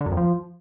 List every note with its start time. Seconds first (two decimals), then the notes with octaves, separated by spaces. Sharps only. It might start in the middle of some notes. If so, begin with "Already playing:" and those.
0.01 D3
0.06 F#2
0.12 F2
0.17 F3